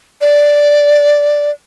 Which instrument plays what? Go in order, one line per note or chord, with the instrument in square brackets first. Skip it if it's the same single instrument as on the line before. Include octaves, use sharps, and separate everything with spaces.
[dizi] D5